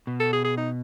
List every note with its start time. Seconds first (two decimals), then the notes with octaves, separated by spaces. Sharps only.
0.07 B2
0.20 A4
0.33 G#4
0.44 G#4
0.57 D#4